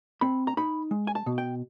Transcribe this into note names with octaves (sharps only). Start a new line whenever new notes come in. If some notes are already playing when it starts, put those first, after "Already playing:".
C4 B5
A#5
D#4 B5
G#3
G#5
A5
B2
G5